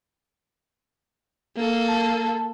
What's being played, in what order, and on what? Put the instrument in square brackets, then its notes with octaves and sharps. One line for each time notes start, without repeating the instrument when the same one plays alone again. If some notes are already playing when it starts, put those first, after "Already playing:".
[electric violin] A#3 A4
[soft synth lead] A5